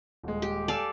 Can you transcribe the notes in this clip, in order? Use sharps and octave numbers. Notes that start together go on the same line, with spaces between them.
D#1 G#3
G4
A4 D5 F5 G#5 D7 E7